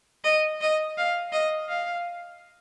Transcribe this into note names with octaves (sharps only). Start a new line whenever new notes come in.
D#5
D#5
F5
D#5
F5